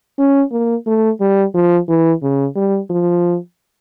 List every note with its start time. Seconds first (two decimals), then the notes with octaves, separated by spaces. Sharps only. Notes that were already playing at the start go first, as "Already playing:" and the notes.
0.19 C#4
0.52 A#3
0.87 A3
1.21 G3
1.55 F3
1.89 E3
2.23 C#3
2.56 G3
2.90 F3